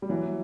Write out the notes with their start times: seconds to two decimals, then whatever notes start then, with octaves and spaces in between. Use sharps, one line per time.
0.02 G3
0.09 E3 F#3